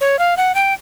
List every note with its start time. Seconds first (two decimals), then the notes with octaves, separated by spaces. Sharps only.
0.01 C#5
0.19 F5
0.37 F#5
0.55 G5